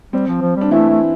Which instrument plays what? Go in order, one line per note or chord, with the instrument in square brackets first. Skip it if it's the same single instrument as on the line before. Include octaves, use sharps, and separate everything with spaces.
[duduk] G3 [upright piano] C4
[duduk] F3
F3
[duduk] G3 [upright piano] D4
[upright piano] E3 E4 [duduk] A3
[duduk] A3